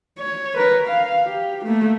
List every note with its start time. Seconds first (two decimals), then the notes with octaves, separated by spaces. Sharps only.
0.19 C#5
0.57 A#4 B4
0.87 F5
1.25 G4
1.66 A3 A#3